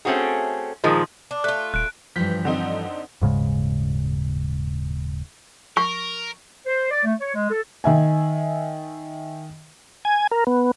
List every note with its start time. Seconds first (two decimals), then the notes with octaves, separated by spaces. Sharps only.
0.05 A3 C4 C#4 F#4 G#4
0.84 A#2 D#3 F3 G#3
1.31 D4
1.44 A3 F4 F#6
1.74 D#1 F#6 D7
2.16 G2 E3 F3 G6 B6
2.45 D3 C4 D#4
3.21 D#1 G#2 C#3 G#3
5.77 A#4 C#6
6.66 C5
6.91 D5
7.05 A3
7.20 C#5
7.35 G#3
7.50 A4
7.84 D#3 E5 G#5
10.05 G#5
10.31 A#4
10.47 B3